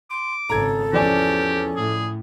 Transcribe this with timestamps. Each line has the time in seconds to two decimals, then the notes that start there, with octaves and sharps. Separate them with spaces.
0.10 C6 D6
0.50 G#1 C#3 A4 A#5 G#6
0.93 E2 F3 C#4 G4 D5 G#5
1.76 A2 G#4